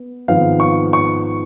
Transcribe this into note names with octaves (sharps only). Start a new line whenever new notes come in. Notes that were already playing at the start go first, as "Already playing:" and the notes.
Already playing: B3
G#1 G#2 F3 B3 F5
C#6
C#6